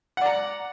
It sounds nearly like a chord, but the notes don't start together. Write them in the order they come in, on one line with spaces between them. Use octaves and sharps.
F#5 D5 A#5